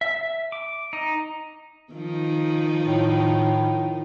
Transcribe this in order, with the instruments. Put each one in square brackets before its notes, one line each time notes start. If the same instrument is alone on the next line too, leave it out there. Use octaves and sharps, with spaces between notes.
[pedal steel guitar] E5
D6
D#4
[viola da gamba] D#3 F3 D#4
[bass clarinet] A2